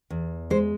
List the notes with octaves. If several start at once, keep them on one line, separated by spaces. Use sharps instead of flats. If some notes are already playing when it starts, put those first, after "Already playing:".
E2
G#3 C5